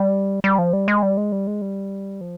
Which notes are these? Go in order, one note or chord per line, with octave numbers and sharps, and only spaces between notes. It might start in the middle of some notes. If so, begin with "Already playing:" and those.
Already playing: G3
G3
F3
G3
G#3
G3
G#3
G3
G#3
G3
F3